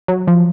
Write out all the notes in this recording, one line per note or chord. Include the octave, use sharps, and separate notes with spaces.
F#3
F3